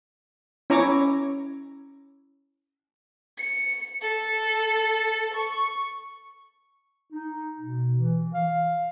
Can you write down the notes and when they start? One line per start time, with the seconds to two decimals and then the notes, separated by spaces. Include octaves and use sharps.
0.70 C#4 E4 C#5 A#5 C#6 D6
3.38 C#7
4.01 A4
5.34 C#6
7.12 D#4
7.60 B2
7.98 E3
8.34 F5